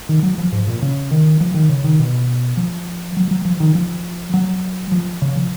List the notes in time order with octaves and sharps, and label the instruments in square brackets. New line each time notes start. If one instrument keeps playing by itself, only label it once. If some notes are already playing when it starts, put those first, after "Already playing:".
[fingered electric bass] D#3
F#3
F3
G#2
A#2
C#3
D#3
F3
D#3
C#3
D#3
B2
F3
F#3
F#3
F3
D#3
F3
F#3
F3
C#3
F3